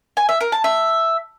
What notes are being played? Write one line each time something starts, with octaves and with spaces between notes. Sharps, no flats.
G#5
E5
A#4
A5
E5